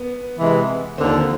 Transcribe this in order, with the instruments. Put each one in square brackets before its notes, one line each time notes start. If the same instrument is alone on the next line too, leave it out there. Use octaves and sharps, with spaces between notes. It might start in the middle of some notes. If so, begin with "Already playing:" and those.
Already playing: [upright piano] B3
[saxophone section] C3 E3 G#3
[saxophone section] D#2 D3 F3 [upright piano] C4